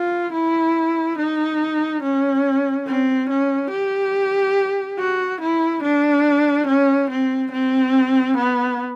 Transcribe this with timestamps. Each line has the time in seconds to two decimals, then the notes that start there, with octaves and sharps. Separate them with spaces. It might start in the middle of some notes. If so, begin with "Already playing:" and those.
Already playing: F4
0.33 E4
1.18 D#4
2.02 C#4
2.86 C4
3.29 C#4
3.71 G4
4.98 F#4
5.41 E4
5.83 D4
6.67 C#4
7.10 C4
7.52 C4
8.37 B3